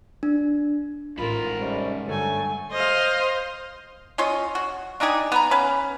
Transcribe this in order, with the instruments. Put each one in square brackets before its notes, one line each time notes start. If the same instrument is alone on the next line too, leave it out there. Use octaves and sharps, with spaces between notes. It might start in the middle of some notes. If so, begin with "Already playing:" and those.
[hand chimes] D4
[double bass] A1 [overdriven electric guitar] G#2 B5 [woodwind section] F4 [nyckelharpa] A#4
[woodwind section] F2 C3 G3 [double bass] C#4
[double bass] G2 D3 [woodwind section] F#3 A3 [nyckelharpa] A4 G#5
[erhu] C5 [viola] D#5 F5
[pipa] C#4 F4 C#5 D#5
F#4
D4 D#4 G4 G#4
B3 B4 A#5
C#4 B4